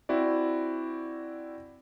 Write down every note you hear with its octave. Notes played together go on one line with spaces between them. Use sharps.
C4 E4 F#4 D5